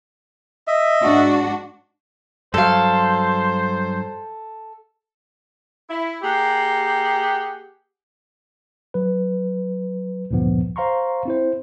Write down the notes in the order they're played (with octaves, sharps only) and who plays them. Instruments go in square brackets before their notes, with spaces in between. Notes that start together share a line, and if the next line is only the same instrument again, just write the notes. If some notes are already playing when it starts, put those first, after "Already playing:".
[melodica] D#5 E5
[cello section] G#2 D4 F#4
[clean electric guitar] G2 F#3 [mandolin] A4 F5 [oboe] C5
[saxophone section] E4
[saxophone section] A#3 G#4 F#5 [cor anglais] G4
[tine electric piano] F#3 B4
D2 G2 A#2 F3 B3
C5 F5 A#5 C6 C#6
C4 E4 C5